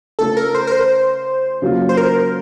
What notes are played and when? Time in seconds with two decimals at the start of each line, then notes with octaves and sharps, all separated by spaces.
0.19 C#3 A3 C#4 F4 A4
0.37 A#4
0.55 C5
0.67 A#4
0.72 C5
1.62 C#3 F#3 A#3 F4
1.89 C5
1.97 A#4